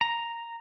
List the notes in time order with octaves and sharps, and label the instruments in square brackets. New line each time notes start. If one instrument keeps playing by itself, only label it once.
[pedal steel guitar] A#5